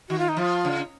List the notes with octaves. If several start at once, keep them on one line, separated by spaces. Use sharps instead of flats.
D#3 F#4
F4
D#4
F3 F4
C#3